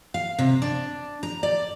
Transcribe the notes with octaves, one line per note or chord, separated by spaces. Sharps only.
F5
C3
D4
A#5
D5